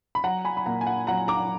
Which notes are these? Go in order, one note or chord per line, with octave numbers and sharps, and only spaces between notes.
B5
F#3 F#5 A#5
G#5 B5
B5
A#2 F#5 A#5
G#5
F#5
F#3 F#5 A#5
A#5 D6